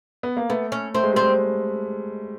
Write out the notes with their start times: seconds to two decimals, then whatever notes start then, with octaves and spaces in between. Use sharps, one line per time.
0.23 B3
0.37 A#3
0.50 A3 B3
0.72 C#4
0.95 A3 C4
1.03 G#3
1.13 G3 C4
1.22 G#3